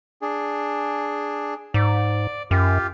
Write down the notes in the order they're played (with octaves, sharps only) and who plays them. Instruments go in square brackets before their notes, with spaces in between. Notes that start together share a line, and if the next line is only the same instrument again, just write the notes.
[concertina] D4 G#4
[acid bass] G#2 [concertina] D5
[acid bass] F#2 [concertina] F4 G4